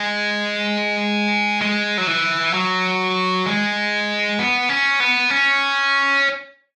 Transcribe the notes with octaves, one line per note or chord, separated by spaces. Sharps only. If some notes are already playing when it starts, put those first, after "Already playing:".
Already playing: G#3
G#3
F#3
E3
F#3
G#3
B3
C#4
B3
C#4